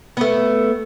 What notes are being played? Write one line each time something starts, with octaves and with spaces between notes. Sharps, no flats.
A3 B3